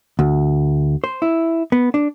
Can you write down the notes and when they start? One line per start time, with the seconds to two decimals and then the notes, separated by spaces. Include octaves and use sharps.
0.19 D2
1.04 C5
1.22 E4
1.72 B3
1.94 D4